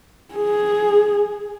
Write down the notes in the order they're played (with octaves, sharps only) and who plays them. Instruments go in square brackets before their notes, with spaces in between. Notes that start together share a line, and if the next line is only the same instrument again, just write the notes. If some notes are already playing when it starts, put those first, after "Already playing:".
[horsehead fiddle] G#4